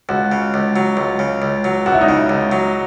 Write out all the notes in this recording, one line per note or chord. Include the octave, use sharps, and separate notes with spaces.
C#2 F#4
C#3
C#2
F#3
C#2
C#3
C#2
F#3
C#2 F#4
E4
D#4
C#3 E4
C#2
F#3